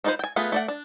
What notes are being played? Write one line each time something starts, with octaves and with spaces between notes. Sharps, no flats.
D4 D#4 F4 B4 C5
G5 G#5
A3 B3 F4 G#4 B4
A3 D5 F#5
D4